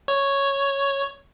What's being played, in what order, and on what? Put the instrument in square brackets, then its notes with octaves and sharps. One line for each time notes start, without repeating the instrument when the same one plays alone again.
[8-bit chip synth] C#5